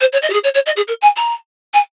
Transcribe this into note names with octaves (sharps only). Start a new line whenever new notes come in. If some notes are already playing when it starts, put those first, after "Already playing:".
C5
C#5
D#5
G4
G#4
C#5
C#5
D#5
G#4
A#4
G#5
A#5
G#5